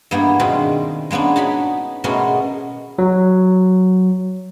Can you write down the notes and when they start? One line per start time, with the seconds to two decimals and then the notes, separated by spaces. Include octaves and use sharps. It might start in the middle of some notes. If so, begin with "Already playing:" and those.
0.11 G2 A#3 B3 E4
0.39 B2 D#3 G#3 C4 D4 F4
1.11 G#3 A#3 B3 C#4 D4
1.36 D#4 F#4 C#5 B5
2.04 B2 G#3 A3 B3 C#4 A#4
2.98 F#3